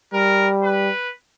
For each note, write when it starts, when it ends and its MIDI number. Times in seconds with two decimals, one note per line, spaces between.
0.13 0.89 55
0.13 0.49 70
0.63 1.10 71